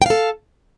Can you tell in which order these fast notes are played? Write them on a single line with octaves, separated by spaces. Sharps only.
G5 F5 A4